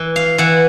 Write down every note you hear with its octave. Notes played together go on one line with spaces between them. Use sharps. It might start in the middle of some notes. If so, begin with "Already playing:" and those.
Already playing: E3
F5
E3 F#5